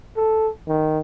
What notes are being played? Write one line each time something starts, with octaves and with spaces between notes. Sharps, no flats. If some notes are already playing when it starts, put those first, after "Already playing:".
A4
D#3